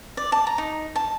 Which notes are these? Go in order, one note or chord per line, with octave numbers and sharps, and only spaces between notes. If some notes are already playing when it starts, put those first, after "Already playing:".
D5
A5
A#5
D#4
A5